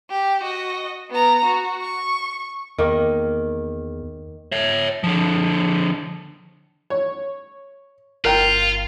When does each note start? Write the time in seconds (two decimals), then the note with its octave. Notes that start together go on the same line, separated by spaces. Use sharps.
0.10 G4
0.43 F#4 D#5
1.10 B3 A#5
1.45 F#4
1.82 C#6
2.78 E2 D#3 A#3
4.52 C#5 E5
5.04 D3 F3
6.90 C#5
8.25 G1 F4 A#4 G5